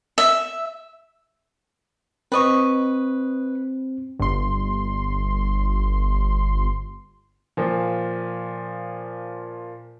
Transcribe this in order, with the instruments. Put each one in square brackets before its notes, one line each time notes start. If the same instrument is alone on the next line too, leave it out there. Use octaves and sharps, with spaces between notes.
[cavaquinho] E5
[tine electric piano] C4 [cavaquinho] B4 D#5 C#6
[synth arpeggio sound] G1 C6
[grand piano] A#2 F3